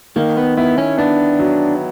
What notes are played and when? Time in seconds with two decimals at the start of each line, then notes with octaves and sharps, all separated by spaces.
0.16 D#3 A#3
0.37 B3
0.57 B3 E4
0.78 C#4
0.98 B3 D4
1.39 F#3